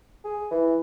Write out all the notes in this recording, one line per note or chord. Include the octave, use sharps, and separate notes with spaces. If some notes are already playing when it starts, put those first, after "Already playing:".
G#4
E3